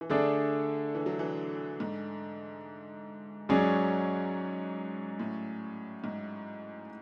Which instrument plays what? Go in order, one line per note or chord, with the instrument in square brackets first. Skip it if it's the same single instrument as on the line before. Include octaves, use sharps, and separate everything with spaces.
[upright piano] E3
[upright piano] D3 [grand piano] A3 D4 G#4 D5
[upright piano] E3
F#3
E3
G#2
[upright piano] G#2 [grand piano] F#3 C#4 G#4 D5
[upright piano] A2
G#2